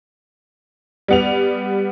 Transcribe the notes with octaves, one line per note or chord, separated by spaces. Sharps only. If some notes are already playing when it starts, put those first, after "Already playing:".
G3 B3 F7